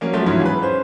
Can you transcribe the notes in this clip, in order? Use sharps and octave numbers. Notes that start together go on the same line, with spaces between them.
F#3 A#3 C#4
F3 F#3 A3
G#2 E3 F#3 C#4 E4 F4
G#4 B4
C#4 C5